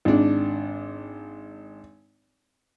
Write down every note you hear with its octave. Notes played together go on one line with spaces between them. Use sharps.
G#1 D4